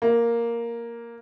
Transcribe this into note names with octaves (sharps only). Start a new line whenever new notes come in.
A#3